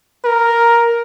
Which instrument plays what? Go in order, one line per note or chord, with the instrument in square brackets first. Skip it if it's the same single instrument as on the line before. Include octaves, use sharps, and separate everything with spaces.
[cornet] A#4